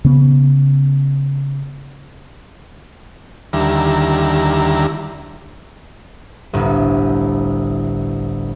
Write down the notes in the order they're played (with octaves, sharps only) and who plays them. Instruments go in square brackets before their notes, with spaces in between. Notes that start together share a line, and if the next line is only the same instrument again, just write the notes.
[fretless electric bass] C#3 B3
[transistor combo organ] D#2 D3 G3 E4 A#5
[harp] G1 C2 A2